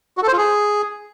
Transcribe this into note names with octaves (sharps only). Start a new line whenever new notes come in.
F#4
A4
C5
F4
G#4